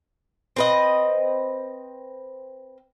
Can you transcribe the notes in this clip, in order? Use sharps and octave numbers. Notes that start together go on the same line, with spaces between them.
C4 B4 D#5